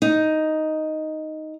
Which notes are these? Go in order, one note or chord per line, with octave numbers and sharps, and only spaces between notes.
D#4